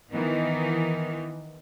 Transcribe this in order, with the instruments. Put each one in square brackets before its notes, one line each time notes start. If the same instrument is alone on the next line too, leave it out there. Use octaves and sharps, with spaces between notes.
[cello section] D#3 E3 B3 D#4